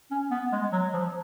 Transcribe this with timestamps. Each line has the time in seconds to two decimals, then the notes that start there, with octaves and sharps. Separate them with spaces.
0.11 C#4
0.31 B3
0.52 G#3
0.72 F#3
0.93 F3